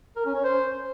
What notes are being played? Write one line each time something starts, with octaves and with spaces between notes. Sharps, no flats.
A#4
C#4
C#5
C5